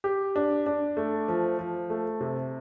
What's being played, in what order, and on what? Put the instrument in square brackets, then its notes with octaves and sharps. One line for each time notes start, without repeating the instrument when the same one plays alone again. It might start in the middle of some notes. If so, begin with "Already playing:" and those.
[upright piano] G4
D4
D4
A3
F3
F3
A3
C3